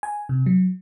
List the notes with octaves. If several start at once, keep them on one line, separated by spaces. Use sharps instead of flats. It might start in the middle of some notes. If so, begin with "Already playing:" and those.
G#5
C3
F#3